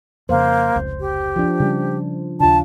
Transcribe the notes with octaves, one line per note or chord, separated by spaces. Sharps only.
F2 C#3 A#3 C5
F1 C#2
G4
F3 D4
C#3 G3 C#4
D#2 C#3 D4 F4 A5